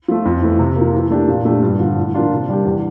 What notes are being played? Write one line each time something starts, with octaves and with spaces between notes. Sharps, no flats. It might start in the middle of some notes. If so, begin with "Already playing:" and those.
F3 A3
F2
E3 A3
C3
A#3
F3
E3
A3 D4 G4
A#2
F3 A3 D4 G4
G2
D3 F3
A2
F3 A#3 D4 F4
C3
G3 D4 G4
E2